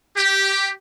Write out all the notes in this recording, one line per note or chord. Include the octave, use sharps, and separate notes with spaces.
G4